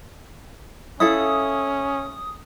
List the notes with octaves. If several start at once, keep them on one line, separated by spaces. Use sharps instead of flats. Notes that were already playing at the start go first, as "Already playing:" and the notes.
C#4 E4 A4 F5 D#6